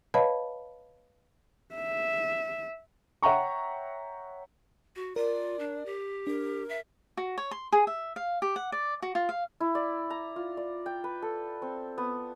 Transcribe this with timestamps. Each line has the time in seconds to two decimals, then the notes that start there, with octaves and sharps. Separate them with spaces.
0.14 B4 C#5 D#5 F5 A5 B5
1.75 E5
3.22 C#5 E5 F#5 G5 A#5 C#6
4.96 F#4
5.16 F4 A#4 D5
5.59 D4
5.85 G4
6.27 D4 A#4
6.69 E5
7.17 F#4
7.38 C#5
7.51 C6
7.73 G#4
7.87 E5
8.16 F5
8.42 G4
8.56 F#5
8.72 D5
9.02 F#4
9.15 F4
9.29 F5
9.60 E4
9.75 D5
10.10 A#5
10.36 F4
10.57 D5
10.86 G5
11.04 B4
11.22 A4
11.62 C4
11.98 B3